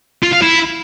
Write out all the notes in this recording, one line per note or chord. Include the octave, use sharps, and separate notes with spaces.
F4
F5
E4